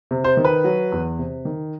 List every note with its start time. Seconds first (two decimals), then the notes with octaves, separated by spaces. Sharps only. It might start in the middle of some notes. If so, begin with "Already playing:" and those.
0.11 C3
0.24 C5
0.37 D#3
0.44 B4
0.64 F#3
0.92 E2
1.19 C3
1.45 D#3